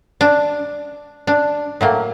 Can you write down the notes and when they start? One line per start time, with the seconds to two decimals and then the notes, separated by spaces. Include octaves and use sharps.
0.21 D4
1.27 D4
1.81 A2 F#3 A#3